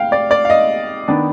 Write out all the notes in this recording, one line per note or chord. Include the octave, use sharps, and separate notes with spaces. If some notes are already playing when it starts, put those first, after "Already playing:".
Already playing: C3 F5 G5
D5
D5
F5
D#5
D#3 B3 D4